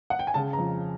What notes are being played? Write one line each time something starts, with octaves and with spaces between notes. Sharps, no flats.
F#5
G5
G#5
C#3 A5
A#5
F2